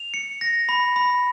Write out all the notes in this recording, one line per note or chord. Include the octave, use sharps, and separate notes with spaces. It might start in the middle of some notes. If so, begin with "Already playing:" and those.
Already playing: F7
C#7
A#6
B5
B5